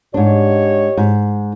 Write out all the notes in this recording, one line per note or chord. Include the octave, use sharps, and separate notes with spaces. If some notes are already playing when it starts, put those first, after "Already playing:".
G#2 D4 G4 C#5 D#5
G#2